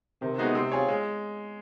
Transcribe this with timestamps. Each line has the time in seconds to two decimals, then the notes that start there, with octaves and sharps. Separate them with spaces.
0.21 C3 D#3
0.38 G#3 B3 D#4 F#4
0.55 C3 C4
0.72 F4 G#4 C#5
0.88 G#3